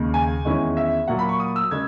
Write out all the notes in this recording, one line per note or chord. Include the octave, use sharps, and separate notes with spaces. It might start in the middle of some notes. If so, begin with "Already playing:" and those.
Already playing: D#2 C#3 G#3
G#5
E2 D#3 G#3 C#4 E4
E5
A#2 F#3 A#3 F#5
B5
C#6
D#6
E6
C#3 G#3 G#6